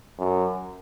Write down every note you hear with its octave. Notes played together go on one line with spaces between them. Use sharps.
F#2